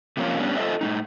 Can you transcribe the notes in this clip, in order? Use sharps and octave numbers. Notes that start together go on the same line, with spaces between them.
C3 F3 A#3 C#4 F4
G#2 G3 B3 C#4 D4
F4 A4 C5 D#5 E5
A2 B3 D#4